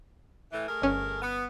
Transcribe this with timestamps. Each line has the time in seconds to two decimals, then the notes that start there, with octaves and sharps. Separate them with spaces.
0.52 A2 E3
0.69 A3 G#4 A#4
0.82 G1 C#4
1.22 B3